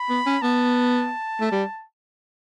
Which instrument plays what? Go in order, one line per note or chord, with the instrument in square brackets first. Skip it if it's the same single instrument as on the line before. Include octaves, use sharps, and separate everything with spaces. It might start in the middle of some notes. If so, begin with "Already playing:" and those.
Already playing: [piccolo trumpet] B5
[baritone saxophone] B3
C#4
[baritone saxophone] B3 [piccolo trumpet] A5
[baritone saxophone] A3
G3